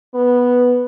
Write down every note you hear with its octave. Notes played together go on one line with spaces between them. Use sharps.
B3